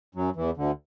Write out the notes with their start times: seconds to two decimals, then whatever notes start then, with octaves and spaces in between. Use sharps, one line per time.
0.15 F#2 F#3
0.36 E2 E3
0.57 D2 D3